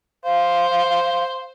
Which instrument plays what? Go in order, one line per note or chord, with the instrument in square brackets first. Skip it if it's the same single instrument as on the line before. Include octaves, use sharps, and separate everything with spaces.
[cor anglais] C5 [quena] F5